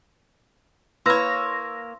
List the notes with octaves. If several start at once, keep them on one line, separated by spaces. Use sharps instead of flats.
A#3 E4 B4 C#5 B5 C6 E6 A#6